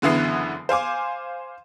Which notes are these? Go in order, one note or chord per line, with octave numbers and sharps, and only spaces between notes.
F#1 D3 E3 B3 C7
C5 F5 G#5 D6